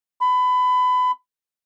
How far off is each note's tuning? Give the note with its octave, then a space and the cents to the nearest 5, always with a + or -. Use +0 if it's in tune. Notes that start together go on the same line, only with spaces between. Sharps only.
B5 +25